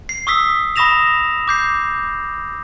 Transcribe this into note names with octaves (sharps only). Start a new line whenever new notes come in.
C7
C#6 D#6 E6 B6
B5 C#6 D#6 A#6 E7 F7
D6 G6 C7